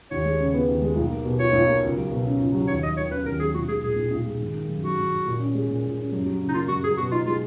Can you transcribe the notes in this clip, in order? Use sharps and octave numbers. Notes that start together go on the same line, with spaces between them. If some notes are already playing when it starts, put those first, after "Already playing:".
D#2 C#5
G#3
C#3
B3
D#2
G#3
B1
A#3
B2
F4 C#5
B1
A#3
C#2
F#3
B2
C#4
C#2
F#3
D#2 C#5
F#3 D#5
D#3 C#5
C#4 B4
D#2 A#4
F#3 G#4
B1 F#4
G#3 G#4
A#2 G#4
B1
B1
G#3
G#1
D#3
F#2
F#3 F#4
G#1
D#3
A#2
C#4
G#3
A#2
A#2
C#4
F#2
F#3
C#3
D#4
A#3 F4
F#2 F#4
F#3 G#4
B2 F#4
D#4 F4
G#3 F4